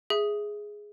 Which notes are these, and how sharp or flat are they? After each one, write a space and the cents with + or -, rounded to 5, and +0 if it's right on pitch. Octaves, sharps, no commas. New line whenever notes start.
G#4 +0 E5 +0